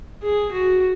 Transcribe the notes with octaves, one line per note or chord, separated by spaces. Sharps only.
G#4
F#4